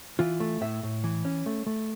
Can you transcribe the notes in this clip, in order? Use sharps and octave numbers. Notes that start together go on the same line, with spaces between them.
E3 F4
A3
A2 E5
A2
E3
C#4
A3
A3